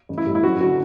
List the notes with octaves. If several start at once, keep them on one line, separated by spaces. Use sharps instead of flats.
A1
E4
A2 G3
E4
F#1 F#4
D3 F#3 F#4